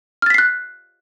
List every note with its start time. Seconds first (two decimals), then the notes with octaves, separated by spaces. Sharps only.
0.22 F6
0.26 A6
0.30 B6
0.34 C7
0.38 F#6